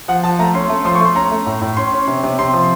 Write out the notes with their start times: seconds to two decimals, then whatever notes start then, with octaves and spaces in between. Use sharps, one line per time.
0.08 F3 F#5
0.23 F3 A5
0.39 A3 A#5
0.54 C#4 C6
0.70 A3
0.85 F3 C6
0.95 C#6
1.00 A3 C6
1.15 C#4 A#5
1.31 A3
1.46 A2
1.61 A2
1.77 C#4 C6
1.92 C#4
2.07 C3
2.23 C3
2.39 C3 C6
2.54 F3